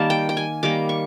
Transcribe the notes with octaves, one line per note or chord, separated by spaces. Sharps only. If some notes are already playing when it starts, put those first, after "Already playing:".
Already playing: D#3 G3 A#3 A5
G5
G5
G#5
D#3 G3 A#3 D6
C#6